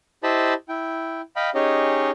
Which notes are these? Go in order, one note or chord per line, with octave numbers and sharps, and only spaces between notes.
E4 G4 C5 D#5 A5 B5
E4 G5
D#5 F5 G5 B5
C#4 D#4 G4 G#4 C#5 D#5